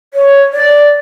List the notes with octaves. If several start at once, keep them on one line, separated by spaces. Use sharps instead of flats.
C#5
D5